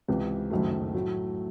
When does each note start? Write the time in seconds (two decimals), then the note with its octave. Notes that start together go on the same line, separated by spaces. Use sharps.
0.08 C#2 C3 E3
0.51 F#1 F#2 D#3 F#3 A3
0.94 A2 F#3 A3